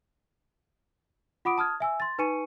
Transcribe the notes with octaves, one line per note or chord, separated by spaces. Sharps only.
F4 F#5 B5 D6 D#6 D7
A5 D#6 F6 G#6
E5 G#5 E6
C6 A6
D#4 B4 G#5 C#6 C#7 D#7